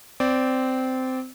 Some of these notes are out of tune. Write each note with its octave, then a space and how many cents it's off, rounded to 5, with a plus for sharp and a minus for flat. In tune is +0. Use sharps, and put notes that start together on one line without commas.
C4 -15 D5 -10